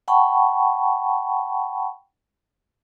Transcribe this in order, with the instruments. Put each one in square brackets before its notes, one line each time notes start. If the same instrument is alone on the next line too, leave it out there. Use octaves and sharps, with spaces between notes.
[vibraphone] F#5 G5 A5 B5 C#6